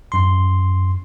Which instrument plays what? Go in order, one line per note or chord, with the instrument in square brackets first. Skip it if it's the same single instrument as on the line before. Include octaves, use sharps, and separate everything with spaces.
[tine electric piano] F#2 C6